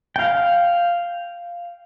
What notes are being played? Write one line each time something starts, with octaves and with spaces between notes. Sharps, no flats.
F5 G5